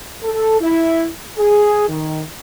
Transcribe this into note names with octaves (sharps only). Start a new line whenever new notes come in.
A4
E4
G#4
D#3